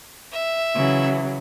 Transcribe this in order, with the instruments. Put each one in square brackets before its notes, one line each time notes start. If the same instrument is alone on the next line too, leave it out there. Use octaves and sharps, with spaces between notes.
[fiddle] E5
[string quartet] C#3 E3 F#3